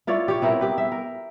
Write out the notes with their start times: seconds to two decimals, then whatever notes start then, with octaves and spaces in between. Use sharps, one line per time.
0.07 E4 F4 C#5 D5
0.28 G4 C#5
0.42 B3 C4 E4 A#4
0.61 G4 B4
0.78 E5
0.92 A#4